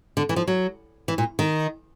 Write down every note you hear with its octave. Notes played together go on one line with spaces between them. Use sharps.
D3
E3
F3
F#3
E3
A#2
D#3